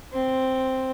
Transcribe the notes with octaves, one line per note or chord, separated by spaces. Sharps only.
C4